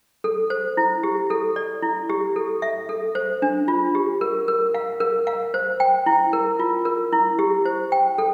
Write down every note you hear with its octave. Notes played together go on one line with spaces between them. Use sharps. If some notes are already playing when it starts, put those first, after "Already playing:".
A4
C5
E4
G4
A4
D5
E4
G4
A4
E5
A4
C5
D4
F4
G4
A#4
A#4
F5
A#4
F5
C5
G5
E4
A#4
F4
A#4
E4
G4
C5
G5
A4